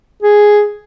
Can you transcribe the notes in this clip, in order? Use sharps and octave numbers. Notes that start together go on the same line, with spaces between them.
G#4